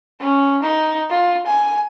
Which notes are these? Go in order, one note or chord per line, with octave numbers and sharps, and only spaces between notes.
C#4
D#4
F4
G#5